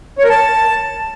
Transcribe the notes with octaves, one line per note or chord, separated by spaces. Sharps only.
C#5
A#4
A5